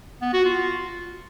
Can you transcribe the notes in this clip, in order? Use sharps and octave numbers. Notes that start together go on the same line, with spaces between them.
B3
F#4
F4